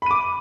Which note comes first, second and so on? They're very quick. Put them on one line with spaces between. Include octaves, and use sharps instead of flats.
B5 D#7 D6